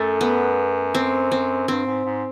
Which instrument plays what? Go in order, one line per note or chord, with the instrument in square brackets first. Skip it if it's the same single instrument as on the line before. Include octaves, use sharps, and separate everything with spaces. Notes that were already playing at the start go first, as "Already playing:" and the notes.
Already playing: [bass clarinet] F#2 [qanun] A3
[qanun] B3
C4
C4
[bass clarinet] G2 [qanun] C4
[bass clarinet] G#2
G#2